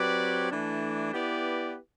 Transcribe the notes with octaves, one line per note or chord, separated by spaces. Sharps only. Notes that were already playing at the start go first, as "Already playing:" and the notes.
Already playing: F#3 C4 G4 B4 D5
E3 A3 D4
B3 E4 G4 B4 D5